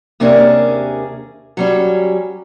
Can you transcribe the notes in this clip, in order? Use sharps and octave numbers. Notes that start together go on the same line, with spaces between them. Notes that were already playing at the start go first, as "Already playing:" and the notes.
D#2 C3 A#3 C#4 D4 G#4
F#3 G3 C#4